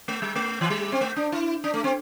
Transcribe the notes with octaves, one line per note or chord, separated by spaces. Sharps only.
A3
G3
A3
E3
G3
C4
A3
D4
E4
D4
A3
C4